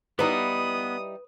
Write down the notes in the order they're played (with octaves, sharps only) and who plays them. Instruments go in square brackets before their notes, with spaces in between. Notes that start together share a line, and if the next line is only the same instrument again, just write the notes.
[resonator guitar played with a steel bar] G3 D#4 E4 [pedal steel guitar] B3 [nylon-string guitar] B4 [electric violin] D#6